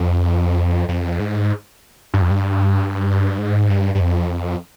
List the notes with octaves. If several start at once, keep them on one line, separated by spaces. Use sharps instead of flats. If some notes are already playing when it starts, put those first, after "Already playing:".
Already playing: F2
F2
G#2
G2
F2
G2
G#2
G2
G2
F2